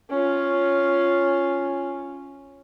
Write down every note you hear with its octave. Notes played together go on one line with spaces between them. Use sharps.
C#4 F4